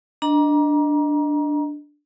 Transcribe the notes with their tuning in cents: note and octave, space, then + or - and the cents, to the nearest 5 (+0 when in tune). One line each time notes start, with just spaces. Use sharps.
D4 +0 D#5 +0 A#5 +25